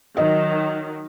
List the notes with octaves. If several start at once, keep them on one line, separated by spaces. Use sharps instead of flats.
D#3 F#3 D#5